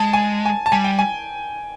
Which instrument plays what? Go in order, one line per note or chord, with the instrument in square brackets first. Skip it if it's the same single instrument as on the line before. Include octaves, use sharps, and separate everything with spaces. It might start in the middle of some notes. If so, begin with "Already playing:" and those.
Already playing: [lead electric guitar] G#3 [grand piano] A5
[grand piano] G#5
G#5
A5
[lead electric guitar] G3 [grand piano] G#5
[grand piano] G5
G#5